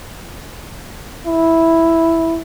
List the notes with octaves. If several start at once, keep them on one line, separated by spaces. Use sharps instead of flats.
E4